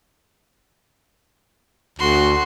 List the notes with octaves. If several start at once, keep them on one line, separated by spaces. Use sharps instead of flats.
D2 F#4 C6